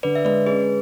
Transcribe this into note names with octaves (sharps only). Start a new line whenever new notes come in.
D3 B4 D5
E5
G#3 B4 D5
C#4 G#4 B4